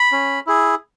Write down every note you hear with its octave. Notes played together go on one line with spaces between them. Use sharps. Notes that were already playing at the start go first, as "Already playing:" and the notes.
Already playing: B5
C#4
E4 G#4